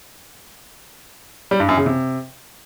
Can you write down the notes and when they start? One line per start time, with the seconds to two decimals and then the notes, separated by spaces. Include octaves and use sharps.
1.51 G3
1.60 G2
1.69 F#2
1.77 C#3
1.86 C3